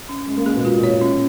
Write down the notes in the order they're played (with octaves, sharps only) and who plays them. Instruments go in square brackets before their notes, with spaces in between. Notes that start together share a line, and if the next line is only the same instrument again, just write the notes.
[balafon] C#4
[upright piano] G#3 [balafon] C#4
[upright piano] A#3
[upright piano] G#3 [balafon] G#4
[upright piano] B2
[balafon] F4
[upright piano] A#2
[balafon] C#5
[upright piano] A#2
[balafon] C#4